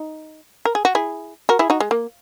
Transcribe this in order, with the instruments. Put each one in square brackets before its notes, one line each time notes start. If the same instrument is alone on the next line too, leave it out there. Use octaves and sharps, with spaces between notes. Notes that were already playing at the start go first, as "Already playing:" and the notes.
Already playing: [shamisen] D#4
A#4
G#4
F#4
E4 G#4
F#4 A#4
E4 G#4
D#4 F#4
G#3
A#3